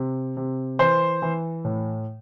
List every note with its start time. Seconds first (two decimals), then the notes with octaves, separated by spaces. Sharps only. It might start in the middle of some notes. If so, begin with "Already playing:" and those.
Already playing: C3
0.37 C3
0.79 E3 C5
1.22 E3
1.65 A2